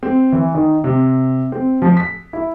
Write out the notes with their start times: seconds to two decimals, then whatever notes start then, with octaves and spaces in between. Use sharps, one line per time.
0.03 C4
0.32 E3
0.54 D#3
0.84 C3
1.52 C4
1.82 F3
1.97 B6
2.33 E4